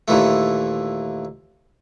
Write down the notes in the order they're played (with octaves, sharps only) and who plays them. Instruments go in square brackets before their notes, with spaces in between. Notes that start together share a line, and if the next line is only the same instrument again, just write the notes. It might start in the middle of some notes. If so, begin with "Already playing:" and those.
[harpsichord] D#2 A#2 E3 A3